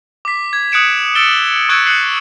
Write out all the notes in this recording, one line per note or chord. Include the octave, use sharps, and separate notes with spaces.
D6 B6
G#6
D#6 F#6 G#6 C#7 D7 E7
E6 A6 C#7 D7 E7 G7
C#6 E6 F#6 G#6 C#7 D7
D#6 F#6 C7 C#7